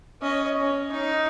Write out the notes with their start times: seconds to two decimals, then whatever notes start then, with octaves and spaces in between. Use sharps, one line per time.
0.21 C#4 D#5
0.61 C#4
0.91 D#4